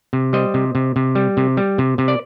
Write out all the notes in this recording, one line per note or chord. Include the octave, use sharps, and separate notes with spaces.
C3
G3 C5 D#5
C3
C3
C3
G3
C3
G3
C3
C3
D5